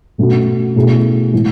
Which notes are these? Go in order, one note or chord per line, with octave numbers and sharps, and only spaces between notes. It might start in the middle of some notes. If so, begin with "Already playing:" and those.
B2 A3 C#4 F#4
B2 A3 E4 G#4
A2 E3 G#3